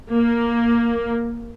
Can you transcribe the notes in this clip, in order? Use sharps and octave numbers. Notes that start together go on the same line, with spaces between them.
A#3